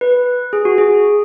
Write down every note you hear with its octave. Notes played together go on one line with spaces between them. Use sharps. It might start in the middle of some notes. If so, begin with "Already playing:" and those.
B4
G#4
F#4
G#4